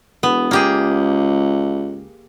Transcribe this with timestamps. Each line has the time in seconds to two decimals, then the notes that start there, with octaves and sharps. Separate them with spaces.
0.23 E1 B3
0.51 C#2 A#3 G4 G#4